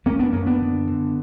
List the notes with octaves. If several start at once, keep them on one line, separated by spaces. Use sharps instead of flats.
F#2 A#3 C#4
B3 D4
F#2 A#3 C#4
B3 D4
D3
D3